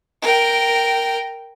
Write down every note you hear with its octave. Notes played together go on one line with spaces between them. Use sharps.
A#4 G5